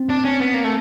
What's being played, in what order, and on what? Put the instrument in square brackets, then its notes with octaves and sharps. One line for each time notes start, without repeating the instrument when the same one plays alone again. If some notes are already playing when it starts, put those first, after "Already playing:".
Already playing: [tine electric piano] C4
[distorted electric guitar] D4
C#4
B3
A#3
A3